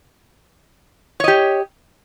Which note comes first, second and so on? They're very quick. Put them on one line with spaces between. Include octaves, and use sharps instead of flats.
C#5 D#5 G4